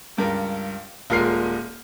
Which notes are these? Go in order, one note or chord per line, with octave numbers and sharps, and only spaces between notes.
C#2 G2 A#4
D#1 A#2 G#3 A#4 F6 C7